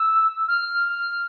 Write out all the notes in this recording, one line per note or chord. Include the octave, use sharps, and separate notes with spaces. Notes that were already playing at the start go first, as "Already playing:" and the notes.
Already playing: E6
F6
F6